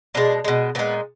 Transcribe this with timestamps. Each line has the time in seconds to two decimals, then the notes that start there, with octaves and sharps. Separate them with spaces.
0.15 B2 G#3 D4
0.44 B2 G#3
0.75 A#2 G#3 B3